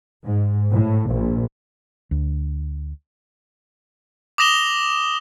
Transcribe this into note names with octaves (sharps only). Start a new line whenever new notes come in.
G#2
A2
A#1
D2
D6 D#6 A#6 E7 F7 G7